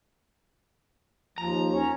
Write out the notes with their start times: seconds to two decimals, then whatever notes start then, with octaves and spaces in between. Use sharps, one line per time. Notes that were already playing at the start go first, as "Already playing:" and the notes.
1.38 D#2 F3 A#5
1.71 C#4 C#5